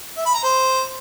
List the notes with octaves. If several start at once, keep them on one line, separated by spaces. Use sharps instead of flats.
E5
B5
A#5
C5